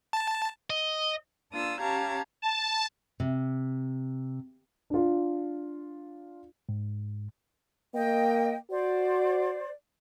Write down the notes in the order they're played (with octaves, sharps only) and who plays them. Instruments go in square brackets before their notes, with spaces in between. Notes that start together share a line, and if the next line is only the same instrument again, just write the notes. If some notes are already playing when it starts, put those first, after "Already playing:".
[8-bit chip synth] A5
[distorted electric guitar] D#5
[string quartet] A#3 D4 F4 D#6 E6
C#4 G4 F5 A5 A#5 G#6
[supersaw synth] A5
[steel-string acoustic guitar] C3
[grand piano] D4 F4
[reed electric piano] G#2
[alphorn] A#3 [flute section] D#5 G5
[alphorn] F#4 [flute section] C5 D5